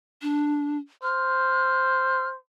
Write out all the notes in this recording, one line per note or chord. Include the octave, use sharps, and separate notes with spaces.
D4
C5 F6